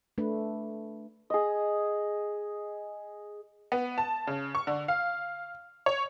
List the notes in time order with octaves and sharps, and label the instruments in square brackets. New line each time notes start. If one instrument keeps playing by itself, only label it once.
[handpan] A3 D4 B4
[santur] G#4 D#5
[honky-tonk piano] B3
A5
C#3
C#6
D3
F5
C#5